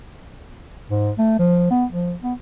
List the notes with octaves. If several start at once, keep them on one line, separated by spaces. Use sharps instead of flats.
G#2
A3
F3
B3
F3
B3